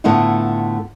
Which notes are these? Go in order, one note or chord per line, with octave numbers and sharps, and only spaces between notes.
A2 D3 A3 B3 E4 F4